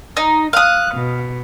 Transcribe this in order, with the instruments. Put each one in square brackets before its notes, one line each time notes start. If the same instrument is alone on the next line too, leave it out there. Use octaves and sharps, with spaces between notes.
[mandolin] D#4
[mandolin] F5 D#6 [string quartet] F#6
[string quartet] B2